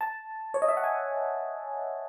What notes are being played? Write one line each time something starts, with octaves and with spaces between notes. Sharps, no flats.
A5
C#5
D#5
E5
F#5
G#5